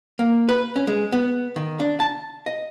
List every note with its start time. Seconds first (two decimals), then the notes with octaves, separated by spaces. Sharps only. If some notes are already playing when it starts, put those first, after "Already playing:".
0.19 A#3
0.49 B4
0.76 C#4
0.87 G#3
1.12 B3
1.56 D#3
1.80 D4
2.00 A5
2.46 D#5